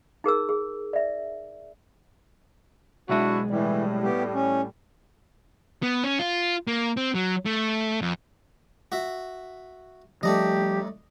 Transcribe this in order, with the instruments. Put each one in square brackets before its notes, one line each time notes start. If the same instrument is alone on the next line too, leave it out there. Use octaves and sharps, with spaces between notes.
[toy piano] D#4 G#4 A#4 E6
G#4
D5 E5
[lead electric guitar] B1 G#3 [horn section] D4 E4 F#4
[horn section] A2 G3 [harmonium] E3
[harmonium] B3 G4
C#4
[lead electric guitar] B3
C#4
F4
A#3
C4
F#3
A3
F2
[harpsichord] F#4 E5
[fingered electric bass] F3 G3 [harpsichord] A3 D4 D#5 [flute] G4